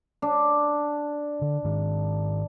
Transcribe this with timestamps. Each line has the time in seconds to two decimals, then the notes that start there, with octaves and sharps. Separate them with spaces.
0.22 D4
1.41 D3
1.65 G#2 D#3